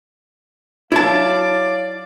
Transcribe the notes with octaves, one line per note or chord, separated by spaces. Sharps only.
F#3 E4 C#5 D5 F5 A5